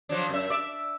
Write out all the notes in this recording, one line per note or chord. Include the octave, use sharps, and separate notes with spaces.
F3 F#3 D4
F#2 E5
D5 E5